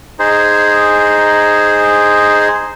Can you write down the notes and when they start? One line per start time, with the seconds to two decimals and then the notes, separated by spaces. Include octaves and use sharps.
0.19 D#4 G#4 C5